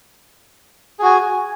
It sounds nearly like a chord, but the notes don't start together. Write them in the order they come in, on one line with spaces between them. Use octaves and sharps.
G#4 F#4 G#5